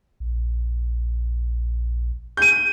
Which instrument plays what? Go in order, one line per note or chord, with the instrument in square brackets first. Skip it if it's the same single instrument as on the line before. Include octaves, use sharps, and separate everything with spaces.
[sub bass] A#1
[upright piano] G6 D#7